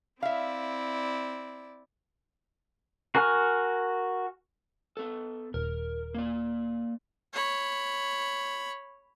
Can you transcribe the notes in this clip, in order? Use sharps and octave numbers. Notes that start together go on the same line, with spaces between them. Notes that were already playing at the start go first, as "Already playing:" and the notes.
C4 E4 D5 E5 F5
F#4 A#4 G#5 C#6 F6
B3 A4
D#1 A#4
A#3 D5
C#5 B5